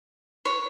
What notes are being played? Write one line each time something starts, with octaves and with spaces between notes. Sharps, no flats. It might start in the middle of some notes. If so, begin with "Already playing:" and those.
C#5